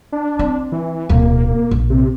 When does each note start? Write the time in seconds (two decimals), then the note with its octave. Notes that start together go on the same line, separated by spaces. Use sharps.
0.12 D4
0.39 C4
0.72 E3
1.09 D1 B2 A#3
1.71 A#1
1.90 C3